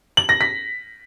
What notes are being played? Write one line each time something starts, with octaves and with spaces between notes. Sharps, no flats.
F#7
A#6
B6